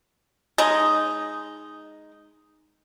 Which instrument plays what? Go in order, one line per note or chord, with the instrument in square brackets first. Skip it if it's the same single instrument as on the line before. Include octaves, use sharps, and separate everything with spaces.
[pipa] G#3 D#4